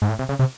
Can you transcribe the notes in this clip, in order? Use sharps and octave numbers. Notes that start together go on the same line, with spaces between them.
G#2
A2
C3
C#3
C3